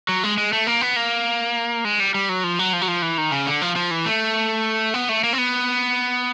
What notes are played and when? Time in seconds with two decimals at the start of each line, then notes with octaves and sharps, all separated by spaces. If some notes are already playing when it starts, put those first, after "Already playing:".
0.09 F#3
0.23 G#3
0.38 G#3
0.53 A3
0.67 A#3
0.81 B3
0.96 A#3
1.85 G#3
2.00 G3
2.14 G3
2.29 F#3
2.44 F3
2.59 F#3
2.73 F3
2.81 F#3
2.88 F3
3.02 E3
3.18 D#3
3.32 C#3
3.47 D3
3.62 F3
3.76 F3
3.91 E3
4.06 A3
4.94 B3
5.09 A3
5.24 A#3
5.33 C4
5.38 B3